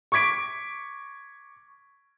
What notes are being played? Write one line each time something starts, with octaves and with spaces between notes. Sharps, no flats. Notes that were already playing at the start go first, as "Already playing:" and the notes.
C#6 D6 G#6 B6 D7